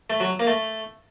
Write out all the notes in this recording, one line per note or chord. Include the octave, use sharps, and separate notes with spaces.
A3
F#3
A#3
A3